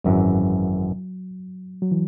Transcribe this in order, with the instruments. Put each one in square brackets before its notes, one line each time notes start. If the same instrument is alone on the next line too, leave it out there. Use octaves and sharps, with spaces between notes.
[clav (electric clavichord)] G#1 F#2 E3 [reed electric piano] F#3
[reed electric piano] F#3
E3